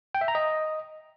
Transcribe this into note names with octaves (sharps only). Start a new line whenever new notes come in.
G5
E5
A#5
D#5